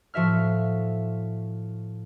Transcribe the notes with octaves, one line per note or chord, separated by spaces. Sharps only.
A2 F3 F#4 E5 F6